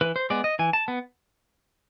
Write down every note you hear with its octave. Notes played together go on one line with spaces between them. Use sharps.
E3 B4
C5
G#3 B3 D5
D#5
E3 G#5
A5
B3